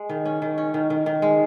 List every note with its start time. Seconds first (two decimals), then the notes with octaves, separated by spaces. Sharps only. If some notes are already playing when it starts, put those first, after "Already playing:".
Already playing: G#3
0.09 D#3
0.25 C#4
0.42 D#3
0.58 C#4
0.74 D#3
0.90 D#3
1.06 D#3
1.22 G#3